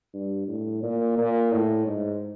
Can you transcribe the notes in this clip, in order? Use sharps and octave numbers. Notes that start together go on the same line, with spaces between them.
G2
A2
A#2
A#2
A2
G#2